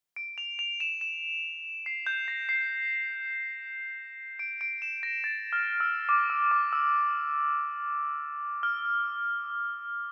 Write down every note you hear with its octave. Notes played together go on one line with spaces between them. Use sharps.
D7
F7
F7
E7
E7
C7
G6
A#6
C7
D7
D7
E7
A#6
A6
F6
E6
D6
E6
D6
E6
F6